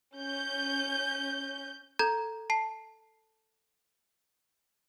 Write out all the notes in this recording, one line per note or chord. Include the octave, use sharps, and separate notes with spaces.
C#4 G6
A4 A#5 G6 G#6
A5 C7